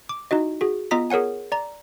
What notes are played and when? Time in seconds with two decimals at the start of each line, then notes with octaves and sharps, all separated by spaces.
0.09 D6
0.31 D#4 E4 F#4 D#5
0.61 F#4 G#4
0.91 B3 F4 D#5 A#5 D#6 B6
1.10 G#4 A#4 C#5 F#5 G#5
1.52 D5 A#5